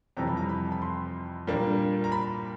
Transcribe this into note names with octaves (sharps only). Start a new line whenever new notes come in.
F2 C3 E3 G3 A#5
B5
A#5
B5
B5
C6
A#2 G3 A#3 D4
A#5
B5